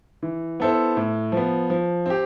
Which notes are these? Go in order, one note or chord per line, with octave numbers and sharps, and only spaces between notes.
E3
B3 E4 A4 C5
A2
F3 B3
F3
C4 G4